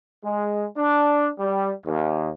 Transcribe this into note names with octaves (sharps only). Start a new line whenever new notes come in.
G#3
D4
G3
D#2